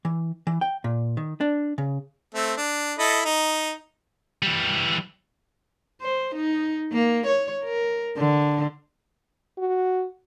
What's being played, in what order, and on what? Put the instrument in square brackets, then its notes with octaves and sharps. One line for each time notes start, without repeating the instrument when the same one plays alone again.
[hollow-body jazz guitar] E3
E3
G5
A#2
D#3
D4
C#3
[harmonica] A3 C4
D4
E4 A4 D#5
D#4
[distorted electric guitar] E3 G3
[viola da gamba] C5
D#4
A#3
C#5
A#4
D3
[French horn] F#4